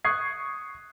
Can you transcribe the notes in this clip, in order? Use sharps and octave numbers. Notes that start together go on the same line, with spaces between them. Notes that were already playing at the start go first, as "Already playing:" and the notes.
C#6 D#6 F#6 G#6 C7